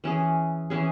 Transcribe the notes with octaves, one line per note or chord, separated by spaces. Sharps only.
E3 C#4 G#4
E3 C#4 G#4